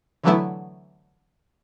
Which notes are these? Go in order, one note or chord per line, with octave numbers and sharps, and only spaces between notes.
D3 E3 F#3 A3 B3 E4